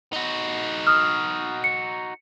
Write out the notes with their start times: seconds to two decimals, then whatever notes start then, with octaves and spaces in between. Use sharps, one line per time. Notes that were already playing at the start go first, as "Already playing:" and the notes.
0.13 D#4 F#4
0.87 D#6 F6
1.64 C#7